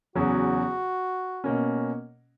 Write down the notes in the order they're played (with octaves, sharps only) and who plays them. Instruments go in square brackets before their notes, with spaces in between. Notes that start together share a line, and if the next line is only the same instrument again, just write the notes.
[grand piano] E2 C#3 F#3 [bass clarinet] F#4
[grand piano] B2 A#3 C#4